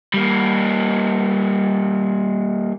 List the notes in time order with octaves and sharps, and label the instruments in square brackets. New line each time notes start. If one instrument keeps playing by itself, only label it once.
[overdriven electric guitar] G3 A#3